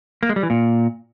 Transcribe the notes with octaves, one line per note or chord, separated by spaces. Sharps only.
A#3
G#3
G3
E3
A#2